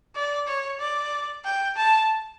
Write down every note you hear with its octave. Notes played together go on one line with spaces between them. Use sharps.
D5
C#5
D5
G5
A5